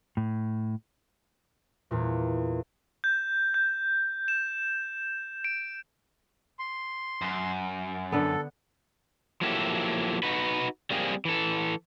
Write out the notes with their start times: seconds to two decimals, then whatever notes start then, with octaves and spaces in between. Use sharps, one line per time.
0.17 A2
1.91 E2 A#2
3.04 G6
3.54 G6
4.28 E7
5.44 D7
6.59 C6
7.22 F#2
8.12 D3 B3 A4
9.41 F3 F#3 A#3 E4 G4 A4
10.23 D#4 F#4 B4
10.91 G3 A#3 C4 G#4
11.25 E3 A4